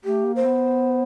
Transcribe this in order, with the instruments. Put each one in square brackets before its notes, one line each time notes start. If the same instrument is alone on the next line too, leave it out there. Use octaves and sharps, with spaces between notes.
[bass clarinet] A3 [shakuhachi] G4
[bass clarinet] A#3
[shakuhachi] C5
[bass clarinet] B3